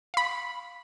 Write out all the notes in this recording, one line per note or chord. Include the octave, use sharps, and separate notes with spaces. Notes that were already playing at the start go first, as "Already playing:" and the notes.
F5 B5